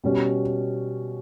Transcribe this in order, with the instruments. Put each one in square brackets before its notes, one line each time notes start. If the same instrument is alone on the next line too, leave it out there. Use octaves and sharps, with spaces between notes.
[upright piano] B2 G3 C#4